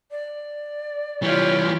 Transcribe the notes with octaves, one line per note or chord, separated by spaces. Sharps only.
D5
E3 G3 F4 G4 C#5